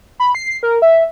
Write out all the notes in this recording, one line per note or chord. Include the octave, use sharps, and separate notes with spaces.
B5
C7
A#4
E5